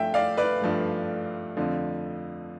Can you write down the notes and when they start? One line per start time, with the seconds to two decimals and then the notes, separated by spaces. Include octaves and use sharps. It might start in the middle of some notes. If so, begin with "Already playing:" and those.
Already playing: G2 F3 A3 E5 G5
0.14 D5 F5
0.37 B4 D5
0.61 G2 F3 A3
1.56 F2 D3 F3 A3